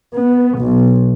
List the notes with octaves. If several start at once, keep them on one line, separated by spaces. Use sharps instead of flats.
B3
B1